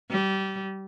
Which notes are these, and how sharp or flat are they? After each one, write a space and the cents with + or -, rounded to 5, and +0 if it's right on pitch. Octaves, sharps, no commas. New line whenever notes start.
G3 -25